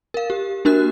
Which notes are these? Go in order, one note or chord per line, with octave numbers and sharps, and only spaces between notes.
A#4 F5
G4
A#3 D4 F#4 A#4 F#6